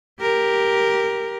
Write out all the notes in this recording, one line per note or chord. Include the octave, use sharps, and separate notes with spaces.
G4 A#4